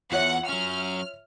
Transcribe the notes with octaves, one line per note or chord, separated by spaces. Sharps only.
E2 F4 C#5 E5 F#5
F#3 C#4 F6